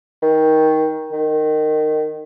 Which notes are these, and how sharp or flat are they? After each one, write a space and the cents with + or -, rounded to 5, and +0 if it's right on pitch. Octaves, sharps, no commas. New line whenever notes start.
D#3 +15
D#3 -15